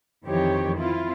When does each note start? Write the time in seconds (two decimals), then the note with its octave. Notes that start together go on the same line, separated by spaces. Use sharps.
0.25 F2 D#3 E3 C4 G4 C#5
0.77 C4 E4 F4